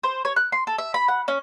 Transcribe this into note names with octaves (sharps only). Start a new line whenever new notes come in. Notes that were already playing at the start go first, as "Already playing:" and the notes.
C5
C#5
F#6
C6
A4
E5
B5
F#5
C#4